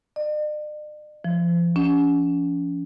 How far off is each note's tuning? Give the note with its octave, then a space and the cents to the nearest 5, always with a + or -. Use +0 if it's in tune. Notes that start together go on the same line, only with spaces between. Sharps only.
D5 +45
F3 -35
C#4 +40